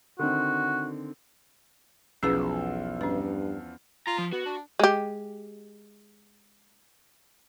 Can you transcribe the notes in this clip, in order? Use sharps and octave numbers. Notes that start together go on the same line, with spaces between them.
D3 D#3 C4 F#4
B1 E2 F3 C#4 G#4 B4 E6
G2 C#4 B4
F4 A#5
F3
B3 F#4
D4
G#3 G4